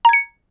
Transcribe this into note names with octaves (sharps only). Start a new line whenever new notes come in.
A#5 G#6 C#7